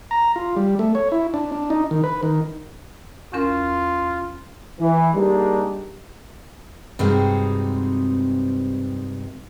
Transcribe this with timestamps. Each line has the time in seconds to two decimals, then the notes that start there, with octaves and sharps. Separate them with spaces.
0.11 A#5
0.36 F4
0.56 G3
0.79 A3
0.95 C#5
1.12 E4
1.34 D4
1.52 D4
1.70 D#4
1.91 D#3
2.04 B4
2.23 D#3
3.33 E2 C#4 F4 A#4
4.80 E3
5.14 G3 G#3 A#3 D4 D#4 G4
6.99 G2 C3 G#3 C4 D#4 F#4